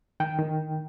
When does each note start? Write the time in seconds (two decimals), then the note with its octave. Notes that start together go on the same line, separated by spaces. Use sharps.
0.20 D#3 G5
0.39 D#3